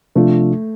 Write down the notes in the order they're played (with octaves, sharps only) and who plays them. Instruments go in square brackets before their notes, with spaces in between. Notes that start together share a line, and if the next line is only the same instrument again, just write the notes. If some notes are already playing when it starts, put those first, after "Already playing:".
[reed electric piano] C3 F3 D4 F4 [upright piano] A3